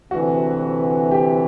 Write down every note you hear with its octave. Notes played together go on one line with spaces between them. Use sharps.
D2 C3 E3 F#4
G4